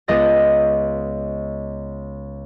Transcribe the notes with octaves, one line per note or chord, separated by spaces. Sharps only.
C#2 B3 D#5 D#6 A6